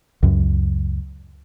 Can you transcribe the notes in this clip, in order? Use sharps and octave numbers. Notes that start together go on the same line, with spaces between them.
C#2 F#2